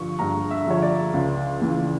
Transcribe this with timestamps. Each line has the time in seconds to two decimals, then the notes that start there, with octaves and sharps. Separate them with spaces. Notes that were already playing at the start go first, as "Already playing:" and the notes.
Already playing: G2 D3 F3 C#6
0.19 G2 A#5
0.51 E5
0.66 D3 F3 C#5
0.82 D5
1.14 C#2
1.62 C#3 E3